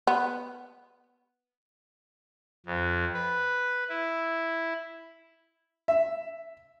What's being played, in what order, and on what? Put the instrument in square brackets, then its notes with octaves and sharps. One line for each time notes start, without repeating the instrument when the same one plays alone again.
[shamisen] B3
[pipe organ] F2
B4
E4
[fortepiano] E5